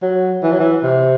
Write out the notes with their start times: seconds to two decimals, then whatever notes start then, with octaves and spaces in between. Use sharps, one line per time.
0.02 F#3
0.43 E3
0.52 F#3
0.60 E3
0.83 C3